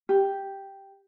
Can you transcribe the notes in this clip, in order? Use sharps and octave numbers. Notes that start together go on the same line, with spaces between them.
G4